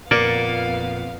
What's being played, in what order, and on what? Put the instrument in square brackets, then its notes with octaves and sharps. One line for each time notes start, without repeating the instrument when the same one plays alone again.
[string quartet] F2 B3 F5 [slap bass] A#2 [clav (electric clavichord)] A#3 D5